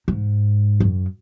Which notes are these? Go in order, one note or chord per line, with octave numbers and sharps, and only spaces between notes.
G#2
F#2